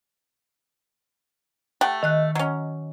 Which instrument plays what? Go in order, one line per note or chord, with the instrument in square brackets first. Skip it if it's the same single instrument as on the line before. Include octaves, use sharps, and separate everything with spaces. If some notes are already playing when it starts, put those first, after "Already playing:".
[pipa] A3 G4 F#5
[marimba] D#3 D#5 F#6
[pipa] F#3 C#4